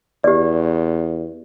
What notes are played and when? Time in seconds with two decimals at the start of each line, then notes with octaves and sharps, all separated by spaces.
0.24 E2 G4 D5